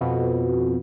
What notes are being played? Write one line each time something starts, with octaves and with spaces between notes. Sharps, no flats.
F2 B2